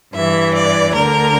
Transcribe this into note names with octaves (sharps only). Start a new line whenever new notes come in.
G2 E3 E5
D5
D2 D3 A#4